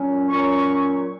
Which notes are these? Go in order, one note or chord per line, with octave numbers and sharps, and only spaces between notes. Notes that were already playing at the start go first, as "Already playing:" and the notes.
Already playing: A#2 F#3 C#4
A#2 F#3 C#4 C#6